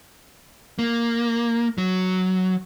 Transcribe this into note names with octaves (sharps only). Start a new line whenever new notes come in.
A#3
F#3